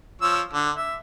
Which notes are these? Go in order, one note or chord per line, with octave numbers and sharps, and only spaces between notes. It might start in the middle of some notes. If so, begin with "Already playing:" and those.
F3 C#5 E6
D3
E5